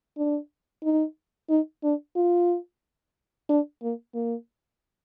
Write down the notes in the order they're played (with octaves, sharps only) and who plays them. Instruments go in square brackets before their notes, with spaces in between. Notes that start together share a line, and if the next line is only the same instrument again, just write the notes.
[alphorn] D4
D#4
D#4
D4
F4
D4
A#3
A#3